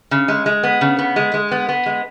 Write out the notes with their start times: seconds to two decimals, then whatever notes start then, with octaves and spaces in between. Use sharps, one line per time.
0.11 C#3
0.28 G#3
0.46 G#3
0.63 B3
0.81 C#3
0.99 B3
1.16 G#3
1.34 G#3
1.51 B3
1.69 B3
1.86 G#3